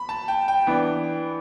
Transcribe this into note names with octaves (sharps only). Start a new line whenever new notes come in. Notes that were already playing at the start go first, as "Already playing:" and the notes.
Already playing: B5
A5
G5
G5
E3 B3 D4